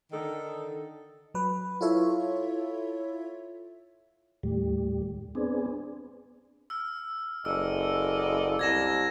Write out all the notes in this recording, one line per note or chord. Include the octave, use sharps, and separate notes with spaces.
D3 D#3 D#4 A4
F#3 B4
E4 F4 A4 C#5 E5
D#2 A2 G3
B3 C4 D4 G#4
E6 F6
F#1 A4 D5 D#5 E6
C2 G#6 A#6 E7